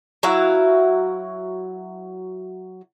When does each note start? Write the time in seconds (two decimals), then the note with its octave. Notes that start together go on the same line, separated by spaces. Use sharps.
0.23 F#3 E4 F#4 F5